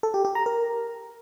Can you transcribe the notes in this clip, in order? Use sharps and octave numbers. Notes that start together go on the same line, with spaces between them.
A4
G4
G4
A#5
A#4